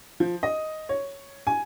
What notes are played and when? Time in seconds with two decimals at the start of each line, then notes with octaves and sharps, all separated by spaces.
0.20 F3
0.43 D#5
0.89 C#5
1.47 G#5